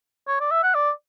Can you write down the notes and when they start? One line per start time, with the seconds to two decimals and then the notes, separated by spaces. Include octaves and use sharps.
0.28 C#5
0.40 D5
0.51 E5
0.63 F#5
0.74 D5